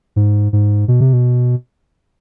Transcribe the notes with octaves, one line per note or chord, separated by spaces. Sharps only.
G#2
G#2
B2
C3
B2